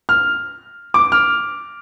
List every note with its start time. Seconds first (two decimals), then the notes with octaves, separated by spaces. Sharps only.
0.09 F6
0.94 D6
1.12 F6